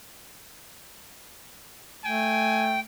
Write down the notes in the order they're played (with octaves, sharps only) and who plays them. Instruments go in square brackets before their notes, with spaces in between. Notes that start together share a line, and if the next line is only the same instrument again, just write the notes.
[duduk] A3 [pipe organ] G5 [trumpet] G#5